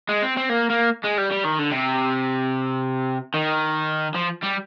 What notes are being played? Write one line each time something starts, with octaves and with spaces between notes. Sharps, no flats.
G#3
C4
C4
A#3
A#3
G#3
G3
G3
D#3
D3
C3
D#3
F3
G3